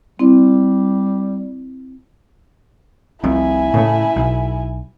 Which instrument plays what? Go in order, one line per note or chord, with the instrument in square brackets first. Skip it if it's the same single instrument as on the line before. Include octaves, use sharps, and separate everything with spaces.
[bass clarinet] G3 [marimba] C4 E4
[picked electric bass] F1 C2 F2 [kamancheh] E4 G#5
[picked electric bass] A2 C#3 A3
B1